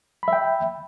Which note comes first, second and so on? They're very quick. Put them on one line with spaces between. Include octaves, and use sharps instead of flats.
B5 E5 G5